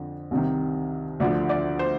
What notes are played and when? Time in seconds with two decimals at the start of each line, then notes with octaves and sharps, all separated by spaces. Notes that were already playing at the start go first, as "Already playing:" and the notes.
Already playing: F2 D3 F3
0.31 C2 C3 D#3
1.20 D2 D3 F3 D5
1.49 D5
1.79 C5